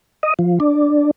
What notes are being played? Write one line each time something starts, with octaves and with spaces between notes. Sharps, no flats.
D#5
F3
D4